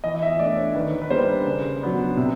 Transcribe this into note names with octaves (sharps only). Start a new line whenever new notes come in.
E3 D#5
D#5
E5
A3 D4 D5
C#5
D#3 B4
B4
G3 A#3 D4 C5
C#3
F#3 B3 D4
C3